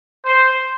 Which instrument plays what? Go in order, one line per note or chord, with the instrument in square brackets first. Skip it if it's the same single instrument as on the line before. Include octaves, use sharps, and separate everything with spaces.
[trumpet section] C5